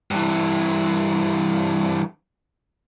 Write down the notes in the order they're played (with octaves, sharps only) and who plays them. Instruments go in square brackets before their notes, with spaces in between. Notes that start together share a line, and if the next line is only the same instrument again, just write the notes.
[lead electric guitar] G2 E3